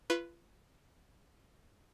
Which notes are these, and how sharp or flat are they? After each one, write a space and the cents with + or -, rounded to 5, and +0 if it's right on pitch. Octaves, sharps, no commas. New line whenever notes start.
F4 -35 B4 +0 C6 +45